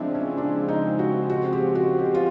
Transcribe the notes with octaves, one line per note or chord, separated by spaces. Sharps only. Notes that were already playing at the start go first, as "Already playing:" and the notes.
Already playing: C#3 F3 G#3 C4 D4 E4
C#4
D4
D#4
F#4
F#4
G4
F#4
G4
F4